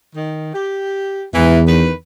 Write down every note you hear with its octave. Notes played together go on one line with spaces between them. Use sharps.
D#3
G4
E2 G#2 E3
D#3 B4